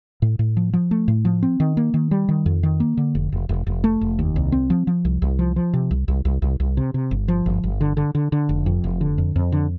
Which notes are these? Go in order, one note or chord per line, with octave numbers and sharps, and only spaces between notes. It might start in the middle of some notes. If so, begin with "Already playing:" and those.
A2
A2
F3
F3
A3
A2
F3
C4
D#3
A#3
D#3
G3
D#3
F2
D#3
A#3
D3
F1
F1
F1
F1
A3
F1
D#2
C2
C4
F3
F3
C2
C2
F3
F3
C3
C2
C2
C2
C2
C2
C3
C3
G1
F3
G1
G1
D3
D3
D3
D3
F1
F2
F1
D3
F2
F2
D3